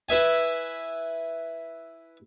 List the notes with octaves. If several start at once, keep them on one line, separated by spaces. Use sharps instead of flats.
E4 B4 E5 G#5